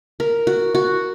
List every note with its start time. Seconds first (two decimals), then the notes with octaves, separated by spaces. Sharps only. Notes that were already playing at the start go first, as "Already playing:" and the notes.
0.20 A#4
0.47 F#4
0.75 F#4